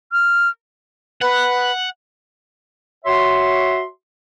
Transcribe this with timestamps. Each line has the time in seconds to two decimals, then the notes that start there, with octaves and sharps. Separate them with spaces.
0.12 F6
1.21 B4 F#5
3.05 F#4 C#5 E5 C6